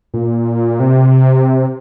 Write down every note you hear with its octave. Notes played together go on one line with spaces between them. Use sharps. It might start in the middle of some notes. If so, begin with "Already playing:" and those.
A#2
C3